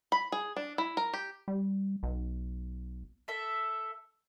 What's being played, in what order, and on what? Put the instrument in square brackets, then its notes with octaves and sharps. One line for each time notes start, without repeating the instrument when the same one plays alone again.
[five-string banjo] B5
G#4
D4
E4
A#4
G4
[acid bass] G3
B1
[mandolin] A4 E5